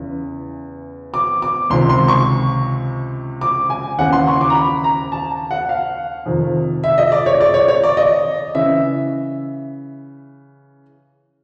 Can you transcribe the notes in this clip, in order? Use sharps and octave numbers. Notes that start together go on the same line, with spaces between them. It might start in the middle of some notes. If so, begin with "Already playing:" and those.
Already playing: E2 C#3 E3
D6
D6
C#2 C3 D#3 C6
C6
C#6
D6
G#5
D#2 C#3 E3 F#5
C6
C#6
D6
A#5
B5
A#5
A5
F#5
F5
F2 C3 D#3
E5
D#5
D5
C#5
D5
C#5
C#5
D5
D#5
C#3 E3 E5